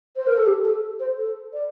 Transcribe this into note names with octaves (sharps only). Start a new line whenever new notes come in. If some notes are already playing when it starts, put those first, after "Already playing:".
C5
A#4
A4
G4
A4
C5
A4
D5